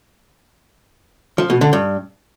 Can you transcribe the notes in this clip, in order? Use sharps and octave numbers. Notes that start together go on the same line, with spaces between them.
F3
B2
D3
G2